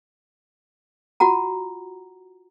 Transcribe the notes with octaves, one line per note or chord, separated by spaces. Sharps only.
F4 F#4 F#5 A#5